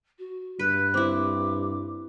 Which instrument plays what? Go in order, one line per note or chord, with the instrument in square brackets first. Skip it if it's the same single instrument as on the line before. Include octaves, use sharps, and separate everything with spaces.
[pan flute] F#4
[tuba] G2 [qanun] B4 [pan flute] F#6
[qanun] C4 E4 [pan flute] D6